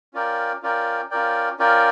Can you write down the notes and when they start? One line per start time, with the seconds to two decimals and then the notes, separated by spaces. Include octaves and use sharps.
0.14 C#4 F4 A#4 D5 G5
0.63 C#4 F4 A#4 D5 G5
1.11 C#4 F4 A#4 D5 G5
1.59 C#4 F4 A#4 D5 G5